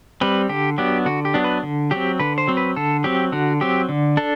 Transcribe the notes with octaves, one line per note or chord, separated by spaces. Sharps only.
G3 C4 B4
D3 G4
F#3 B3 D4 G4
D3 F#4
G4
F#3 B3 D4
B4
D3
F#3 C4 G4
D3 B4
C5
F#3 C4
B4
D3 A4
F#3 C4 G4
D3 F#4
F#3 C4 G4
D3
D4 A4